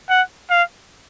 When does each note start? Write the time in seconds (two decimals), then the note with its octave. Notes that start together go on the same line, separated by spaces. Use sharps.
0.09 F#5
0.50 F5